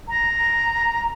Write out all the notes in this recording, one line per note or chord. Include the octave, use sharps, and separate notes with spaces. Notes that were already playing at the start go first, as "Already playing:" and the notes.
A#5